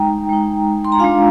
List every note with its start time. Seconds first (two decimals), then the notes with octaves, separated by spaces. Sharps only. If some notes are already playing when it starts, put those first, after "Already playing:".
Already playing: G#3 D#4 G5 A#5
0.29 G#3 D#4
0.85 C6
0.92 A#5
0.99 G#3 D4 F4 F5 G#5